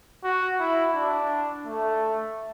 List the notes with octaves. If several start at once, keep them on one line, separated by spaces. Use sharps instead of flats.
F#4
E4
D4
A3